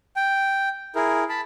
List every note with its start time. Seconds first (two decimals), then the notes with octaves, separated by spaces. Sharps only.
0.16 G5
0.95 E4 G#4 A#4
1.29 A5 B5